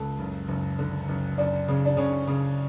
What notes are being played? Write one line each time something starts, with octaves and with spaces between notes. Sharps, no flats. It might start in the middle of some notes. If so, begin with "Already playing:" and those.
Already playing: C#2 A4
F#1
F#1
D3
F#1
F#1 D4
C#3
D4
C#3 C#4
C#3